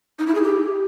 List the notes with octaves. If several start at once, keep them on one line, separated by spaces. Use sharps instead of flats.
D#4
E4
G#4
G4